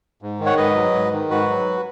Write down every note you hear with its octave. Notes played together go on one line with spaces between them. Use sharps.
G#2
D#3
C#5 F#5
G#2 B4 D#5
F#3
G#2
D#3
G#2 F#4 B4
F#3